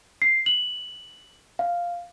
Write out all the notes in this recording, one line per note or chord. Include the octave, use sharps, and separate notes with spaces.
C7
F#7
F5